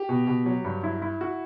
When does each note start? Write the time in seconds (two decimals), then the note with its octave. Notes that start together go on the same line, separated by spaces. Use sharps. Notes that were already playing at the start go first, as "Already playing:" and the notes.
Already playing: G4
0.09 B2
0.27 B2
0.46 F#3
0.64 G2
0.83 E4
1.02 E4
1.21 F#4